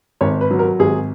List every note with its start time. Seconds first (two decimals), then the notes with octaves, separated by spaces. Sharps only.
0.21 G#1 C#5
0.41 B4
0.51 F#3
0.59 A#4
0.79 G#1 G#4